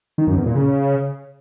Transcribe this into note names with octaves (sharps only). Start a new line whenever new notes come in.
D#3
F#2
E2
A#2
C#3